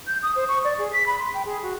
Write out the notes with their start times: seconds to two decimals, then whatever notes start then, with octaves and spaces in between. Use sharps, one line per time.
0.07 G6
0.23 D#6
0.36 C5
0.48 C#6
0.64 D5
0.78 G#4
0.93 B6
1.06 B5
1.19 C6
1.34 G5
1.45 G#4
1.63 F#4